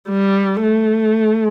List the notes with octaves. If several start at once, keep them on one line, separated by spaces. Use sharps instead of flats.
G3
A3